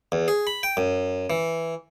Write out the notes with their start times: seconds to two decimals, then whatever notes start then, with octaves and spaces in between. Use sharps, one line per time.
0.12 E2
0.28 G#4
0.47 B5
0.63 G5
0.77 F#2
1.30 E3